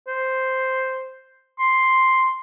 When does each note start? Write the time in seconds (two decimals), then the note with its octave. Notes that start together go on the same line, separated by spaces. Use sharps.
0.08 C5
1.59 C6